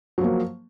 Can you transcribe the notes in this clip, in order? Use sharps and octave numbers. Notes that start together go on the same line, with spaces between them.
F3 F#3 A#3